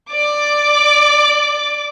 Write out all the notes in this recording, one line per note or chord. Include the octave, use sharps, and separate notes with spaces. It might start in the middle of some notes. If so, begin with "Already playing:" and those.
D5 D6